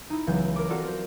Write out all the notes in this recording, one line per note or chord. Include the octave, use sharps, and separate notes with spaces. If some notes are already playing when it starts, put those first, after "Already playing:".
D#4 E4
C#2 E3 F#3 B3 G6
A#4 D6
C4 F4 F#4 A4 A#4 D5
A#4 C5